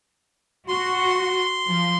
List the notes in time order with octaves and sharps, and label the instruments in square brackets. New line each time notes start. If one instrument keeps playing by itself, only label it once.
[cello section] F#4 [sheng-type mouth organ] C6
[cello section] F3